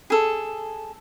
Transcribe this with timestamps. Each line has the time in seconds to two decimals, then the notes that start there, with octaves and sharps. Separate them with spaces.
0.10 G#4 A4